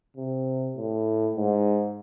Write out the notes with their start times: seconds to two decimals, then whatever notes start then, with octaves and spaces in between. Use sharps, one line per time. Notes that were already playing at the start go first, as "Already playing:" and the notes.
0.17 C3
0.77 A2
1.36 G#2